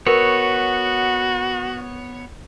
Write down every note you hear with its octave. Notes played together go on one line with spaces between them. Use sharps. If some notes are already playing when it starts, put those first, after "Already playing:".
B3 F#4 A#4 B4 C#5